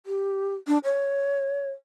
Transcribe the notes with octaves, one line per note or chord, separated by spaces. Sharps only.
G4
D4
C#5